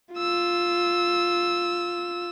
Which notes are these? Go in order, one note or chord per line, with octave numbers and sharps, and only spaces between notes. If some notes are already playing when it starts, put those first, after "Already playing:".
F4 E6